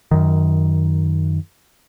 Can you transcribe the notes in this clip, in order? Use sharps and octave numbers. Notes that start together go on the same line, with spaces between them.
F#2 D#3